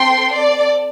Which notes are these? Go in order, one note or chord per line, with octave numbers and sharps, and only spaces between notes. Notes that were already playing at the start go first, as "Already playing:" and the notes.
Already playing: C4 A4 G5 C6
D5